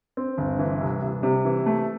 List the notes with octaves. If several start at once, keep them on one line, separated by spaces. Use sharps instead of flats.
C4
G1
E3
C2
C2
C3
E3
A3